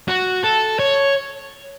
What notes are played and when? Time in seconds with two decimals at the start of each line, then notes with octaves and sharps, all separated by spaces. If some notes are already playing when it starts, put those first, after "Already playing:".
0.08 F#4
0.44 A4
0.79 C#5